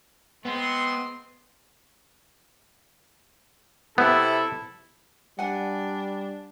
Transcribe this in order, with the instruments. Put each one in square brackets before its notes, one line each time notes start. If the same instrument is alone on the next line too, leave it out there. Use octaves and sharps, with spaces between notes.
[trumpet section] G#3 C4 C6 [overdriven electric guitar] B3
[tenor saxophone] C3 [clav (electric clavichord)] B3 [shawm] E4 [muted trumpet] A4
[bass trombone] G3 [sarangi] D4 [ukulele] F#5 G#5